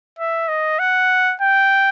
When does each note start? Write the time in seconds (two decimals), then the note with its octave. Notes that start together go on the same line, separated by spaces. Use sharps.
0.19 E5
0.48 D#5
0.79 F#5
1.41 G5